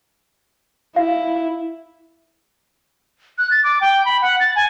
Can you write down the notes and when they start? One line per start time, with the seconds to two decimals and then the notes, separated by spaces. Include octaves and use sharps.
0.96 E4 F5
3.38 F#6
3.51 A6
3.64 D6
3.81 G5
4.05 B5
4.22 F#5
4.40 A6
4.56 G#5